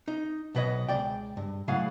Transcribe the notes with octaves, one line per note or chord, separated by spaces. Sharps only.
D#4
B1 B2 B4 C#5 D#5
C#2 D5 G5
G2
A2 C#3 F#3 G#4 F5 F#5